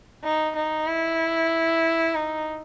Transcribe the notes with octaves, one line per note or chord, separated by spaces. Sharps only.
D#4
D#4
E4
D#4